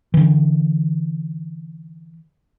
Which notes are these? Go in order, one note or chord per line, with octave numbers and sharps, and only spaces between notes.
D3 E3